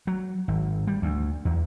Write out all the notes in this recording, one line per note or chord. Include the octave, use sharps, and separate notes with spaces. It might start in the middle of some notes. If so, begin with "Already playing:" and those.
F#3
G#1
G3
D2
E2